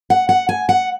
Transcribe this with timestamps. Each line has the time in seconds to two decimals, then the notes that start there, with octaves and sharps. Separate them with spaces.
0.10 F#5
0.29 F#5
0.49 G#5
0.69 F#5